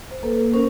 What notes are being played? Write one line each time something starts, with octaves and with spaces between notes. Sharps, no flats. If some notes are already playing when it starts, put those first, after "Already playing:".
C5
A#3 A4 B4
C#4 A#4 C5